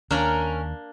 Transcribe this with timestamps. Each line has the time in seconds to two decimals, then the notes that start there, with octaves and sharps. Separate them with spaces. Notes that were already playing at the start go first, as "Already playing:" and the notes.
0.11 D#2 A#3 C#4 D4 A#4